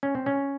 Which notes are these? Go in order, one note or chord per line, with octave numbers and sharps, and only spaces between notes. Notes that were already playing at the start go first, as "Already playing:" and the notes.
C#4
C4
C#4